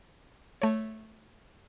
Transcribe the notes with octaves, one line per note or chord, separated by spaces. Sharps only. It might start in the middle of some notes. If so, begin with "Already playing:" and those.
A3 C#5